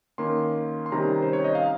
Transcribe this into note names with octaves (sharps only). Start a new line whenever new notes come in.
D#3 A#3 C#4 C6
C6
C3 D#3 G3 C#4 A#5
C5
C#5
D#5
F5